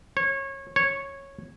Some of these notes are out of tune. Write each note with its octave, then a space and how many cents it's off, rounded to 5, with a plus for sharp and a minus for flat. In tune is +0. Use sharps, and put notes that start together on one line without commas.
C#5 -25
C#5 -10